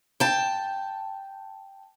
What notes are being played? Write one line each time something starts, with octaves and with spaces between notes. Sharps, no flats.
G5 A5